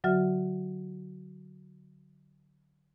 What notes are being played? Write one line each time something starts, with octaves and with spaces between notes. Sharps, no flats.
D3 F#3 F#4 E5 F6